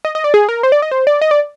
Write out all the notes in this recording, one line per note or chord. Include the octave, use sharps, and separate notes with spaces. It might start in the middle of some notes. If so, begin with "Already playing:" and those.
D#5
D#5
D5
G#4
A#4
C5
D5
D#5
C5
D5
D#5
D5